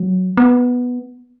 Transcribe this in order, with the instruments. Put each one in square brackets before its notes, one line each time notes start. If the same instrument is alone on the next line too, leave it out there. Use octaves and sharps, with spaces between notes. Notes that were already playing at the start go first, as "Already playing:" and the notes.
Already playing: [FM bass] F#3
B3